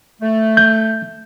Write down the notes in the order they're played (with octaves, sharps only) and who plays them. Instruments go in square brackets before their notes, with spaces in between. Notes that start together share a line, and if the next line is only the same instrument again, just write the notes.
[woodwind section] A3
[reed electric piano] G6